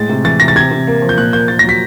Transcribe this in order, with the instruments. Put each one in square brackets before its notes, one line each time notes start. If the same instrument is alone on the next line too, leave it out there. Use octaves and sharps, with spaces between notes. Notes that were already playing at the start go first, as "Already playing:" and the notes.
Already playing: [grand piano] A2 G#3 A6
C3
E3 A6
C3 A#6
A6
C3 G#6
C3
A#3
F3
G6
A#2 F#6
A#3 G6
A#3 A6
A#6
F#3 B6